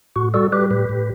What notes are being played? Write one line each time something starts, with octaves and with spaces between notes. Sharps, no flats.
A2 F#4
G3 F#4 A4
G3 G4 B4
A2 G4 B4
A2